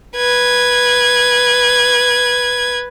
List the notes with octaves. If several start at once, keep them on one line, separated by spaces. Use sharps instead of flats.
B4 G#6